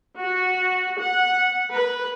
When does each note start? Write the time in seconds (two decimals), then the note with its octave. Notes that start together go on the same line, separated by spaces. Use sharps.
0.20 F#4
1.00 F#5
1.71 B4